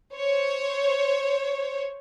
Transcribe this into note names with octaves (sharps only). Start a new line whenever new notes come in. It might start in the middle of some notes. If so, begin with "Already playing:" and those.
C5 C#5